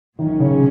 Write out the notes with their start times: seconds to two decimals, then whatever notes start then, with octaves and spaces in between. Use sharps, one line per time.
0.19 A#1 A#2 D#3 F#3 A#3 C#4
0.40 C#3